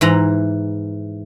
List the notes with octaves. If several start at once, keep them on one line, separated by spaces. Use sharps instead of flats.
G#2 E3 A#5